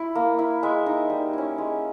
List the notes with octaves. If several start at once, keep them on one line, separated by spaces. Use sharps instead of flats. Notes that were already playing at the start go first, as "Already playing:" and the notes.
Already playing: E4
A#3
E4
G#3 E5
D#4
G3
C#4 E4
G#3